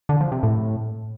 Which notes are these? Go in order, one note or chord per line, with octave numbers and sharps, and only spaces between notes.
D3
F3
C3
A2